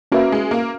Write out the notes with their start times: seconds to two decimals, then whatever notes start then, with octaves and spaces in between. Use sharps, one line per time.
0.12 A#3 C#4 F#4 B4 E5
0.32 G#3
0.51 A#3